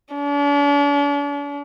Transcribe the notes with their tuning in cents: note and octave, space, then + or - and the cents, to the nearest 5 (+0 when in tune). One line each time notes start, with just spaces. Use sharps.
D4 -45